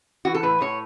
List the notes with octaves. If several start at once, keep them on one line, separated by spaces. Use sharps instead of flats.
E3 F#4
A4
A2 B4
A2 C#5